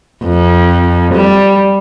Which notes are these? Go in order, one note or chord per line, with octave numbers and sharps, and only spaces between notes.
F2
G3